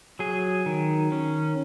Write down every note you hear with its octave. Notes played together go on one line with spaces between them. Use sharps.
F#3 G#4
D#3
C#4